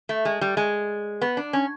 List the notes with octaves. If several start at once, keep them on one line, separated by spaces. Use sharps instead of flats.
A3
G#3
G3
G#3
B3
D4
C#4